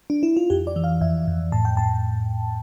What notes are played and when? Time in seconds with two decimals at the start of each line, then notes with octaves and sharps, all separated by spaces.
0.10 D4
0.23 E4
0.37 F4
0.50 F2 G4
0.67 D5
0.76 E3
0.84 F5
1.01 F2 E5
1.28 F2
1.52 A2 A5
1.65 G5
1.77 A2 A5